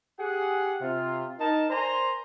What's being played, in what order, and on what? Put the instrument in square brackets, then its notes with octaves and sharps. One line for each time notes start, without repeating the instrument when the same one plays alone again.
[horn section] G4 G#4 F#5
C3 F4
D#4 A#4 A5
A#4 C5 D5 G#5 A#5 C6